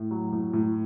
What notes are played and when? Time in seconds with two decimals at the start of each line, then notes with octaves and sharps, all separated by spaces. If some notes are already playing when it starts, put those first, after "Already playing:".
Already playing: A2
0.11 F#3
0.32 A2
0.53 A2